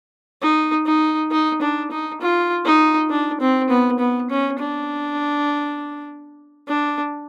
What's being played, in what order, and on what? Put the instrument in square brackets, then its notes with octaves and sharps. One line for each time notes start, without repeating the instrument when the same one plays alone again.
[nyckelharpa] D#4
D#4
D#4
D4
D#4
F4
D#4
D4
C4
B3
B3
C#4
D4
D4